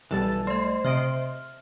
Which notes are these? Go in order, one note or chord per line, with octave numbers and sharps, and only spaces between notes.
B1 E3 G3 A4 A5 A6
A3 C5 D#5
C3 D#5 E5 F6 D7